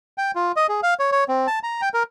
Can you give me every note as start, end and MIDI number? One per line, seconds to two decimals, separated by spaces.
0.18 0.31 79
0.35 0.52 65
0.56 0.67 75
0.69 0.81 68
0.83 0.94 77
0.99 1.11 73
1.12 1.24 73
1.28 1.47 60
1.47 1.59 81
1.63 1.81 82
1.82 1.89 79
1.94 2.03 70